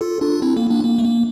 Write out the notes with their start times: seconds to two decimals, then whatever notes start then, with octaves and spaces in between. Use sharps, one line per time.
0.01 F4 A4
0.21 D4 F4
0.42 C4 E4
0.57 A#3
0.70 A#3 D4
0.85 A#3
0.98 A3
1.04 A#3